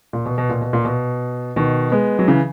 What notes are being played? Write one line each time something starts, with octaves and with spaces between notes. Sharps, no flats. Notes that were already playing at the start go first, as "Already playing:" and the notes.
A#2
B2
B2
A#2
B2
A#2
B2
B2 D#3
G#3 B3
F#3
C#3 E3